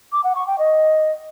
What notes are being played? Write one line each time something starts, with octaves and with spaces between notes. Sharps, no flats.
D6
F#5
C#6
G5
D#5